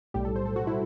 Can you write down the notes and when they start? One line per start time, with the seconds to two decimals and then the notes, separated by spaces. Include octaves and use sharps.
0.14 B1 A2 G3 G4
0.25 A4
0.36 C5
0.46 A4
0.56 F#4
0.67 E4